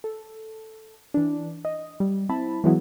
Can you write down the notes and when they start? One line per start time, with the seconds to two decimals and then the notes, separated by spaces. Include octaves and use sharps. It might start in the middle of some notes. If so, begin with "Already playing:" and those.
0.04 A4
1.14 E3 D4
1.65 D#5
2.00 G3
2.29 C4 E4 A5 B5
2.64 E3 F#3 G#3 B3 E4 F#4